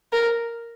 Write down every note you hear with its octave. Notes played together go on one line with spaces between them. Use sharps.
A#4